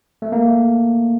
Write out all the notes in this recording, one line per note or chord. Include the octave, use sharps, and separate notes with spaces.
A3
A#3
A3